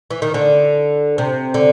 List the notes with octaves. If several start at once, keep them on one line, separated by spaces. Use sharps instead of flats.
E3
D#3
D3
C3
D3